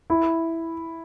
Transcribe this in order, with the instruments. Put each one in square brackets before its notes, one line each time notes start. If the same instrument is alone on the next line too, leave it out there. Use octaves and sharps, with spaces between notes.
[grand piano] E4